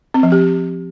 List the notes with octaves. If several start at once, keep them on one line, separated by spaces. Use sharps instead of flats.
C4
F3
G4